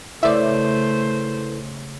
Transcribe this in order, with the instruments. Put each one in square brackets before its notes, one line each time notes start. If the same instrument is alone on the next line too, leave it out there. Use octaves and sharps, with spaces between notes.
[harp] C#3 [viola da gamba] A3 C5 [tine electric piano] E4 A4 B4 [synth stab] D5 E5